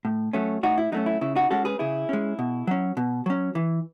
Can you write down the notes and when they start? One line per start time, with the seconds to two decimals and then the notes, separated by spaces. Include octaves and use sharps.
0.05 A2
0.33 F#3 A3 C#4
0.63 A2 D#4 F#4
0.78 E4
0.92 F#3 A3 C#4 D#4
1.06 E4
1.21 C#3 E4
1.36 D#4 F#4
1.50 G#3 C#4 F#4 A4
1.65 G#4 B4
1.79 C#3 E4 G#4
2.09 G#3 C#4
2.39 B2
2.67 F#3 C#4
2.97 B2
3.26 F#3 C#4
3.55 E3